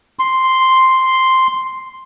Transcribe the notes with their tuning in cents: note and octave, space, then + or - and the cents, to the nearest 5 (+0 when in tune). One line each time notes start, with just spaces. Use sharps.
C6 +0